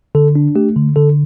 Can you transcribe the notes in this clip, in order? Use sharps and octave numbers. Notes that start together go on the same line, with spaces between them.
D3 A4
D4
A3 G4
D3
D3 A4